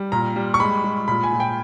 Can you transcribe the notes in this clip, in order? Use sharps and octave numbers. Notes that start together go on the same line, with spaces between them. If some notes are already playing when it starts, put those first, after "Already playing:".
Already playing: G3
A#2 A#5
G3
C#6
G#3 B5
G#3
A#2 B5
G#5
A#2
G5